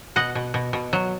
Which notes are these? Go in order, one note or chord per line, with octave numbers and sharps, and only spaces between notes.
B2 D#5 F#5
B2
B2
B2
F#3